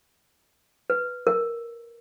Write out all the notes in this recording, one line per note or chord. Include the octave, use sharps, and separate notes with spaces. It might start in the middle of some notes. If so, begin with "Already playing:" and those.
B4
A#4